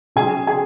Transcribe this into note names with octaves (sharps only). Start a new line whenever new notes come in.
C#3 F#3 G#4 G#5
G#4 G#5